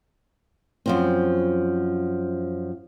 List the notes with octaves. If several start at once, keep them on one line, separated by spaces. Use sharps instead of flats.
F#2 F3 C4